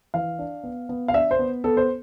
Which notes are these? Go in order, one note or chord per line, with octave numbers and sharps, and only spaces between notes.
E3 F5
D4
B3
B3
F5
D4 E5
C5
B3
B3 A4
C5